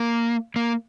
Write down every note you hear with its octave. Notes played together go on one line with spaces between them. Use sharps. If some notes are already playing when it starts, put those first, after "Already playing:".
Already playing: A#3
A#3